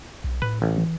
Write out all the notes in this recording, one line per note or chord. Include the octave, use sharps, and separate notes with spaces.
B1
A2 B4
A1
E3